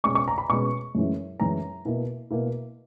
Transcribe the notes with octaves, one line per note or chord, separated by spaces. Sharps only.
B2 G#3 C#4 C#6
C#6
A#5
B5
B2 G#3 C#4 C#6
F#2 E3 G#3 C#4 E4
F#2 E3 G#3 C#4 E4 A#5
B2 A#3 E4
B2 A#3 E4